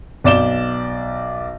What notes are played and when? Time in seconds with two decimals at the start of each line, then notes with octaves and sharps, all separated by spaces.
0.24 B1 D5 E7 G7